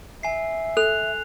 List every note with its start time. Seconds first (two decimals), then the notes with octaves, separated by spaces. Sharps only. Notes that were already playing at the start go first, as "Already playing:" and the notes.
0.23 E5 G#5 C7
0.77 A4 F#6 F7